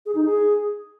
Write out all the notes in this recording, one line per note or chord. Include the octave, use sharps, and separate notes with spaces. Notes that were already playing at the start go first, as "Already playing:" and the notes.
G#4
D#4
G#4